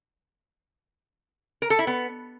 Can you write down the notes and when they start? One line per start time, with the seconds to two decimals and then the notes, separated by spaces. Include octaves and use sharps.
1.62 A#4
1.70 A4
1.79 E4
1.87 B3